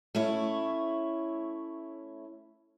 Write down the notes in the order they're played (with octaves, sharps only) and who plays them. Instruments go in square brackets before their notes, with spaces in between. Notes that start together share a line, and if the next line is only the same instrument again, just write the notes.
[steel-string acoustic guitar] A3 C#4 E4 C#5